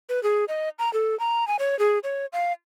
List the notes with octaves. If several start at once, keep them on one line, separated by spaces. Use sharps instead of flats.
B4
G#4
D#5
A#5
A4
A#5
G#5
C#5
G#4
C#5
F5